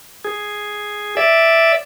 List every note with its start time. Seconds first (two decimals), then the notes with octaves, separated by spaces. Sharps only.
0.25 G#4
1.17 D5 E5